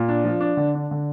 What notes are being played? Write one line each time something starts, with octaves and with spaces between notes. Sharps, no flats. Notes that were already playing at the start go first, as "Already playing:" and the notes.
Already playing: A#2
D4
F3
D4
D3
D4
D3